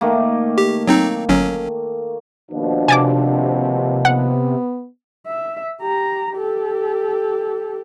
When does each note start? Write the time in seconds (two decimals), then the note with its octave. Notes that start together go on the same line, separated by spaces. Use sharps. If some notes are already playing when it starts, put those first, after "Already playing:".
0.01 D#3 A3 A#3
0.58 G4
0.88 F#3 C4 D#4
1.29 G1 F#3 C#4
2.51 D#2 B2 F3 D4
2.88 C3 G#5 A5 D6
4.05 B3 F#5
5.27 E5
5.81 G4 A#5
6.34 G4 A4